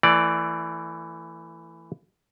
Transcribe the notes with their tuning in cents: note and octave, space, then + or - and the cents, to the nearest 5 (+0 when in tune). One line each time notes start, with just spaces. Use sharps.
E3 +10 A3 +30 D5 +0